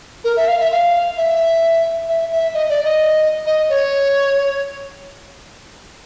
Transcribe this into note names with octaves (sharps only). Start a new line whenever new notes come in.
A#4
E5
F5
E5
F5
E5
E5
E5
D#5
D5
D#5
D#5
C#5